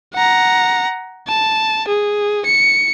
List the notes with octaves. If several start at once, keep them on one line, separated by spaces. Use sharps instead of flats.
F#5 A#5
A5
G#4
C#7